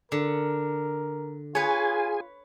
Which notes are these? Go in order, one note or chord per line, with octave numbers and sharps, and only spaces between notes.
D3 A#4
F4 G#4 B4 C#5 G#5